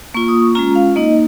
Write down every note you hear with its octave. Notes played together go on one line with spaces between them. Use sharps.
A#3 F4 C#6
D#6
C#6
G#3 C#4 F4 A#5
F5
A#3 D#4 D#5